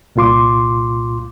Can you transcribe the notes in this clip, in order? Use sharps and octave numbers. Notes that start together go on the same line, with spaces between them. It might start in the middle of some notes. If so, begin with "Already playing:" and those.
C2 A#2 F4 C6 D6